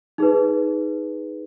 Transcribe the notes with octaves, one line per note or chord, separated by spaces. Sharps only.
D#4 G#4 B4